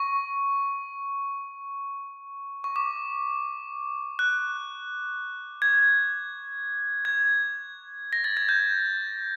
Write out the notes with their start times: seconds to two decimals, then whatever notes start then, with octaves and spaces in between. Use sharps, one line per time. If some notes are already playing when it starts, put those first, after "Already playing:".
Already playing: C#6
2.64 C#6
2.76 D6
4.19 F#6
5.62 G#6
7.05 G#6
8.13 A#6
8.24 A6
8.37 G#6
8.49 G6